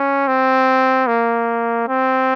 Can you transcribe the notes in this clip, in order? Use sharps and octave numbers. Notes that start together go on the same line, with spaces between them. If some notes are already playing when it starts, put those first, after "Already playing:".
Already playing: C#4
C4
A#3
C4